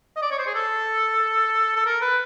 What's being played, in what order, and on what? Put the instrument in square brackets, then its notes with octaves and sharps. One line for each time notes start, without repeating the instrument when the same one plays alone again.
[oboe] D#5
D5
C#5
C5
G#4
A4
A4
A#4
B4